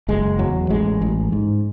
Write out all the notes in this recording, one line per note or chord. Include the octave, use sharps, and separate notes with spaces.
F#1 G#3
E2 F#3
A1 G#3
A1
G#2